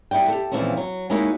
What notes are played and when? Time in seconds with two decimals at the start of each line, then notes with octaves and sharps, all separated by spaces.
0.11 G3 B3 E4 D5 G5
0.28 G4 A4
0.52 A#2 E3 F3 G#3 C4 C#4
0.77 F#3
1.10 G#3 A#3 D#4 E4 F#4 C#5